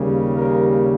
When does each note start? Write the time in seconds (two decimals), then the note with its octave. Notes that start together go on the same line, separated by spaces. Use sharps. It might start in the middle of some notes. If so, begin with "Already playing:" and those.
Already playing: D#2 C#3 G3 A#3
0.36 A#4